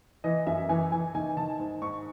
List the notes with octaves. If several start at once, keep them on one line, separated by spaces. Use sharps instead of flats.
E3 D#5
F#2 E5
E3 G#5
E3 G#5
D#3 G#5
D#3 A5
G#2
G#2 C#6